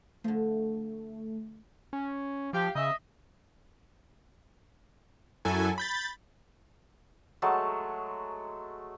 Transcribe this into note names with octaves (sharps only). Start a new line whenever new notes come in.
D3 F3 A3
C#4
F3 G4 F5
C#3 D#5 E5
F#2 F#3 E4 A4 G#5
B5 G6 A6
F#3 G#3 A3 A5